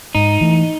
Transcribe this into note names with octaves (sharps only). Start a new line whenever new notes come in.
G#2 D#4
E3 A3